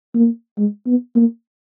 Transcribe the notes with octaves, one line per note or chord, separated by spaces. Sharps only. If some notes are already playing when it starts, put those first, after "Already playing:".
A#3
G#3
B3
A#3